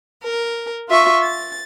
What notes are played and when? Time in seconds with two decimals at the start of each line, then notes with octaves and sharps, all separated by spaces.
0.23 A#4
0.88 F4 E5 C#6
1.23 A6